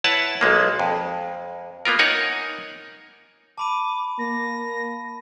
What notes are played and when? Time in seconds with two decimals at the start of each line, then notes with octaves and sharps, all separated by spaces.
0.04 E4 B4 C#5 F#5 A5
0.41 B1 G#3 A#3
0.79 F2
1.85 A#3 B3 F4 A#4
1.99 D#4 A#4 C#5 F#5 G#5
3.58 A5 B5 D6 D#7
4.19 A#3 A#6